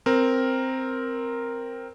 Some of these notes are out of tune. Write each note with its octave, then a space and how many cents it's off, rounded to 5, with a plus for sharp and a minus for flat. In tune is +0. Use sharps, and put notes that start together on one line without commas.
C4 +0 A#4 +0